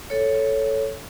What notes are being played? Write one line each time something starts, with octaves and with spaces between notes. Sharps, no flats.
A4 C#5